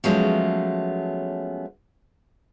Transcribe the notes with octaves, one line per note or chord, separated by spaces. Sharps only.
F3 F#3 G#3 A3 B3 C#4